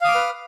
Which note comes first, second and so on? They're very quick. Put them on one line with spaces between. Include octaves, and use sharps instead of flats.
F5 D#6 D6 F6 B4